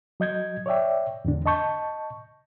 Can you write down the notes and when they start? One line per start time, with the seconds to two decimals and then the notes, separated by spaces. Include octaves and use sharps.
0.20 F#3 D#5 G6 G#6
0.66 C#5 D5 E5 G5
1.25 E2 G#2 D3 D4
1.46 D#5 A5 C#6 G6